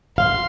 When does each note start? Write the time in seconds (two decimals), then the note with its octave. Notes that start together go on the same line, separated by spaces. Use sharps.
0.18 F5 C6